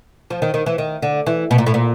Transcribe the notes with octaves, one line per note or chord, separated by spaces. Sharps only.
F3
D#3
D#3
E3
D#3
D3
E3
B2
A#2
A2
A#2